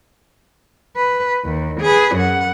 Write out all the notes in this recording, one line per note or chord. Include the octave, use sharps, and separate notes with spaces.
B4
D#2
G#4 B4
F#2 F#5